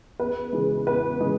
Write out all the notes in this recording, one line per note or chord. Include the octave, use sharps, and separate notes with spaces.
E2 B4
C#3 E3 G#3
E2 B4
C#3 E3 G#3